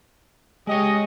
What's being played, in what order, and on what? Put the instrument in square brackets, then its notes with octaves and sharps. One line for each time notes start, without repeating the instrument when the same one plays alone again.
[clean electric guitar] G#3 C#5 [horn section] G4 D#5